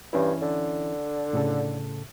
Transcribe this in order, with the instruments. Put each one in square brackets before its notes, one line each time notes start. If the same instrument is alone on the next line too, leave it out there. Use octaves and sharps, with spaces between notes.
[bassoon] G2 [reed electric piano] E3 C#4 E4
[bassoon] D3
[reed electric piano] A2 C#3 A4